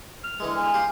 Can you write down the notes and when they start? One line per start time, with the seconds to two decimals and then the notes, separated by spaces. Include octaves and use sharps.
0.24 F6
0.40 D3 E3 G#3
0.56 G#5
0.74 G4 F5